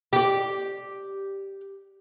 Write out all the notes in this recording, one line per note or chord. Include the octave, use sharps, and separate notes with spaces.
G4 D5